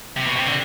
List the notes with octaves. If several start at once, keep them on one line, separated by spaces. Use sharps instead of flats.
C3
B2
C3
D3